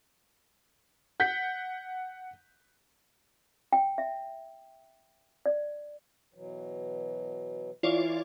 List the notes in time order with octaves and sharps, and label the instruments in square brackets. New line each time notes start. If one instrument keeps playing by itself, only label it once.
[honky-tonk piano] F#5 G6 B6
[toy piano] G5
E5
D5
[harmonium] B2 E3 F#3
[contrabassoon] E3 [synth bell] F4 C#5 D5